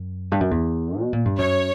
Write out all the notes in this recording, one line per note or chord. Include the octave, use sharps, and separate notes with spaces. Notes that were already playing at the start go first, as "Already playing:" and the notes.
Already playing: F#2
G2
F#2
E2
B2
A#2
G2
F#2 C#5